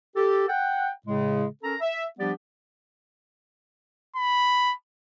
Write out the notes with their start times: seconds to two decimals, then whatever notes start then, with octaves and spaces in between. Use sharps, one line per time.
0.16 G4 A4
0.48 F#5 G5
1.07 A2 C#3 G#3
1.63 C#4 A4 A#4 A#5
1.81 E5
2.19 F3 G3 B3 D4 G4 D5
4.16 B5